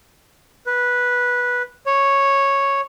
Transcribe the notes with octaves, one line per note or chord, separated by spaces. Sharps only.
B4
C#5